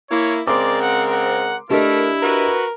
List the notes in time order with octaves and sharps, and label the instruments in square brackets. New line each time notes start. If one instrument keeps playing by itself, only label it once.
[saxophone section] A#3 E4 [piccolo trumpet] C#5
[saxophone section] C#3 G#3 C4 [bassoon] A#4 [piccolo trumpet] D5 [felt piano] C6 D6
[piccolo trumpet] F#5
F#5
[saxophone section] A3 A#4 [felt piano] D4 G4 D#5 [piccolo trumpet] E4
[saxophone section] F#4 B4 [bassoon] A#4